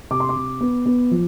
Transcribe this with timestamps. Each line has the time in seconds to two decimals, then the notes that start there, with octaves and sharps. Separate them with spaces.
0.11 C3 D6
0.20 C6
0.29 D6
0.36 C3
0.61 B3
0.86 B3
1.11 F3